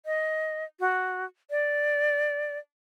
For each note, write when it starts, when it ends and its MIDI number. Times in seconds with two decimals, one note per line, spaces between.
0.06 0.64 75
0.80 1.25 66
1.50 2.58 74